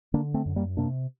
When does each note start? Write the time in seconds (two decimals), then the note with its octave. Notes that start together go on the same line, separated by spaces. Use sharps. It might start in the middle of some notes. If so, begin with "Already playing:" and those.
0.14 D3 A#3 D4
0.34 A3 C4
0.46 F#2
0.56 G3 A#3
0.77 C3 A#3 D4